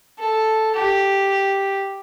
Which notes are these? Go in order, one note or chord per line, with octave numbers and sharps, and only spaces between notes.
A4
G4